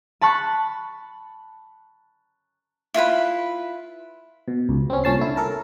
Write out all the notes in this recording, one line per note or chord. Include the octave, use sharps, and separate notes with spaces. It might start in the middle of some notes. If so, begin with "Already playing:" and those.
A5 B5 C#6 F#6
E4 F4 B4 B5
B2
C#2
C4 C#4
C2 A#2 C#4 A5 C7
D3 E4
A4 A#4 A5